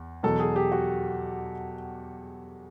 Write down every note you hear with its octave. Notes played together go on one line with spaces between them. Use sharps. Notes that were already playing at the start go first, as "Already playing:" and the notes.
Already playing: E2
E2 B2 F#3 A4
G#4
G4
F#4